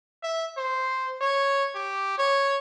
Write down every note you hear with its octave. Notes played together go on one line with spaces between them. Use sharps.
E5
C5
C#5
G4
C#5